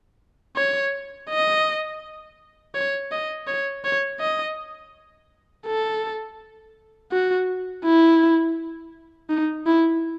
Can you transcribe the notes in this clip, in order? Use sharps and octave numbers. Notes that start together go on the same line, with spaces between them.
C#5
D#5
C#5
D#5
C#5
C#5
D#5
A4
F#4
E4
D#4
E4